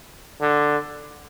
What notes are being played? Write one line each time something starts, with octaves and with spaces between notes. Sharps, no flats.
D3